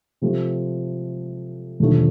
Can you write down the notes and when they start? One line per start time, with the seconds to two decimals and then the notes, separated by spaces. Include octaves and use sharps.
0.22 C3 F3 A3
1.80 E1 D#2 D3 F3 A3